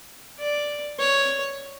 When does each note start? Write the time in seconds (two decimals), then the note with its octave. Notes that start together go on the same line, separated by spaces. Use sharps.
0.39 D5
0.99 C#5